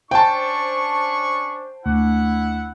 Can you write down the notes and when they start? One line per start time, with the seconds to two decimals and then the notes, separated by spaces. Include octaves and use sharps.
0.11 C#4 D4 C5 G5 A5 C#6
1.86 D2 E4 F#5